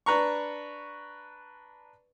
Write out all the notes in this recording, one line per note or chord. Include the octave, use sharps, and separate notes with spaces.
D4 B4 A#5 C#6